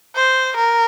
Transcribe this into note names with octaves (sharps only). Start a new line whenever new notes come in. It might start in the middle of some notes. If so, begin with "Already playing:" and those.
C5
A#4